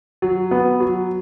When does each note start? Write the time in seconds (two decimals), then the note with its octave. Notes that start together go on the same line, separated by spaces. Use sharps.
0.22 F#3
0.51 B3
0.80 F#3